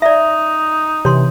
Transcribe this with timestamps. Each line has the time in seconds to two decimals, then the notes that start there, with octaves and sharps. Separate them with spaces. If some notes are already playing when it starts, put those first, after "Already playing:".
0.02 D#4 D5 E5
1.05 C3 E3 C#5 C6